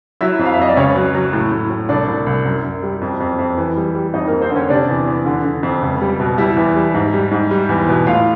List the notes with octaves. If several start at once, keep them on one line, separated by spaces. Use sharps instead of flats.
F#3 E4 E5
F2
F5
E5
F2 D#5
D5
C#2 C#4 C#5
F#3
F#3
A2
A2
A2
C2 D4 D5
C2
C2
F#2
F#2
G3
F2
F2
F2
E3
G3
G3
F2 D#4 D#5
F2 A#3 A#4
C4 C5
D3 C#4 C#5
C3 D4 D5
E2
E2
D3
D3
F2
C#2
G3
B2
G3 E4 E5
E2
G3
G#2
G3
G#2
G3
E2
B2
A2 F4 F5